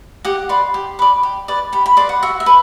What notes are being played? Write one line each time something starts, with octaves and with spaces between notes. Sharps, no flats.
G4 F#5
B4 D5 C6
G4
B4 D5
G4
B4 D5
G4 B5
B5
B4 D5 C6
F#5
F#4 E5
E5
B4